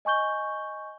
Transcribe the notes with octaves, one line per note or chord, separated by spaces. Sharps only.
D#5 G#5 C#6 G6 G7